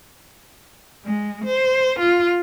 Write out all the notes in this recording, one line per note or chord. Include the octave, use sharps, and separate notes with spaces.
G#3
C5
F4